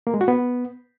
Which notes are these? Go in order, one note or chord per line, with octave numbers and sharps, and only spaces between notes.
A#3
G#3
F#4
B3